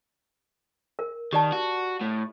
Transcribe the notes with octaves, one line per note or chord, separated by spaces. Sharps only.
A#4
D#3 G4 D5 A5
F#4
A2